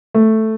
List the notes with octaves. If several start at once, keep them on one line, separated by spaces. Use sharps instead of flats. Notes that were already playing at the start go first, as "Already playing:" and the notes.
A3